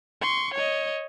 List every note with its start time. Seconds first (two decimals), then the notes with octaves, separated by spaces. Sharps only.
0.21 C6 C#6
0.54 C#5 D#5